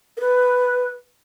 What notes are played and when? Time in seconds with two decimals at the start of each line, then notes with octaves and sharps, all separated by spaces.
0.17 A#4
0.21 B4